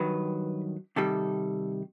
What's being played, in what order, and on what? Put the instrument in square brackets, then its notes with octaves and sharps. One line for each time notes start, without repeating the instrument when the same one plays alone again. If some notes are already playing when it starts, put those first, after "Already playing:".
Already playing: [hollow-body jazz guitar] G2 D#3 F#3 B4
C3 D#3 G3 A4